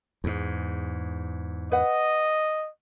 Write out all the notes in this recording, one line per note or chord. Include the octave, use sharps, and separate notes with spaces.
E2 G#2
B4 D#5 F#5